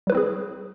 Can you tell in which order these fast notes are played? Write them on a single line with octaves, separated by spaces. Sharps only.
G3 B4 E4 C4 G#4